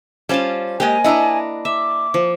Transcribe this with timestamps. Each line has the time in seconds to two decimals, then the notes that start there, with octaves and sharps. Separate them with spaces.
0.29 G3 C#4 F4 C5 A5
0.80 G#3 A#3 G4 D#5 G#5
1.04 D4 E4 D#5 F#5 A#5
1.65 E5 D6
2.14 F3